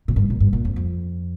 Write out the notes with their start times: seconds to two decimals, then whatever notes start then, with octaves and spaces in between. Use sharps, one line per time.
0.08 A#2
0.16 G2
0.30 A#2
0.40 G2
0.53 A#2
0.65 F2
0.76 F2